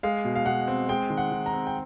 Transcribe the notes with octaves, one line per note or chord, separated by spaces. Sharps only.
G#3 F5
B2
F5
B2 F#5
C4
G#3 G5
D#3
F#5
D#3
A#5
C4
G5